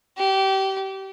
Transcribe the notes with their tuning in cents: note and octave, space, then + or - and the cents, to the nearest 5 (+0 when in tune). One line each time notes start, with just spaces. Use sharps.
G4 -25